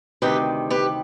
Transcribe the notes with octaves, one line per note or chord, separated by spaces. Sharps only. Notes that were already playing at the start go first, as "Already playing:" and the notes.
D2 C3 D#3 G4 B4
G4 B4